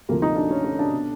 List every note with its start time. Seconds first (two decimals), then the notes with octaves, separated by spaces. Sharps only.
0.09 D2 C3 F3 A#3
0.22 D#4
0.36 D4
0.51 C#4
0.64 C#4
0.79 D4
0.93 B2